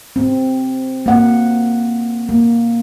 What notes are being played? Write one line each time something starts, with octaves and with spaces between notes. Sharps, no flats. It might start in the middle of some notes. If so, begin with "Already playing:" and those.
C4
A#3 F#5
A#3